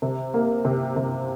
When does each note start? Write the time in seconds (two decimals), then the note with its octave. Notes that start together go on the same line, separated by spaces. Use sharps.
0.02 C3
0.34 A#3
0.65 C3
0.96 C3